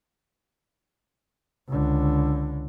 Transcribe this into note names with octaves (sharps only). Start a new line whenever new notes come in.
C#2 D3